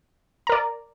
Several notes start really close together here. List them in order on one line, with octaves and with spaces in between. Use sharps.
A#5 A#4 D5